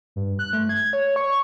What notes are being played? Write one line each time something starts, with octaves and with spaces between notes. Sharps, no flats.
G2
F#6
A3
G#6
C#5
C#6